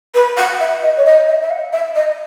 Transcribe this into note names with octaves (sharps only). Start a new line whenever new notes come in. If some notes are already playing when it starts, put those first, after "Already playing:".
B4
F#5
E5
D#5
C#5
D#5
E5
E5
F#5
E5
D#5